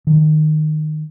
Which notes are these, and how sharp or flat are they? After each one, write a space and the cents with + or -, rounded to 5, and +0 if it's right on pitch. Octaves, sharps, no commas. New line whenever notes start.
D#3 -15